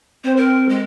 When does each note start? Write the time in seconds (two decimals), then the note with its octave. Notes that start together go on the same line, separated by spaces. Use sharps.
0.24 C4 C5
0.37 A#4
0.69 G#3